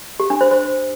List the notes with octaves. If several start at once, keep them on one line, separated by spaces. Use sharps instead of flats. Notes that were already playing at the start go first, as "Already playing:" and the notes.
G4
D4
C5
C5